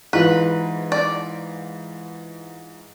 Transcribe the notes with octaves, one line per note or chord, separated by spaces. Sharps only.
G#2 E3 F4 B4
D5